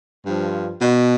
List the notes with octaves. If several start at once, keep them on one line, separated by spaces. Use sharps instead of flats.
G2 F3
B2